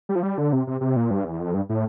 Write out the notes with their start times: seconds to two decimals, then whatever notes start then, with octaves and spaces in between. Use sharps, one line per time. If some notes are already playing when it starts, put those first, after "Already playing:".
0.09 G3
0.16 F3
0.23 G3
0.38 D3
0.53 C3
0.67 C3
0.81 C3
0.96 A#2
1.11 G2
1.24 E2
1.40 F2
1.54 G2
1.69 A2